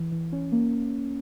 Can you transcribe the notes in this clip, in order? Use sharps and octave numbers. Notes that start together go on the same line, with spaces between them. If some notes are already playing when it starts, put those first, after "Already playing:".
Already playing: E3
E3
C#4
A#3